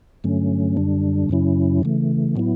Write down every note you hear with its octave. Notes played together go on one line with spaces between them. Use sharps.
G2 D3 F#3 A3 C#4
F#2 D3 G3 D4
F#2 C#3 F#3 C#4 E4
C#3 E3 A3
A2 F#3 B3 E4